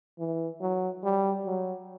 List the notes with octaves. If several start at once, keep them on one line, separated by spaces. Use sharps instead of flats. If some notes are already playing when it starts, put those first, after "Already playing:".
E3
F#3
G3
F#3